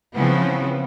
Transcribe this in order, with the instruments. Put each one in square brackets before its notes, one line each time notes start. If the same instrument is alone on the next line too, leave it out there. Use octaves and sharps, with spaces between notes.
[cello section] C#3 E3 F3 B3 C4